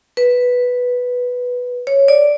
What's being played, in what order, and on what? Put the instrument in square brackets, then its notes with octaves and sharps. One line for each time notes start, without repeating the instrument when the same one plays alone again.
[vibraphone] B4
C#5
D5